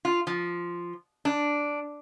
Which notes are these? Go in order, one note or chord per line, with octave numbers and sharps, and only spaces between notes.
F4
F3
D4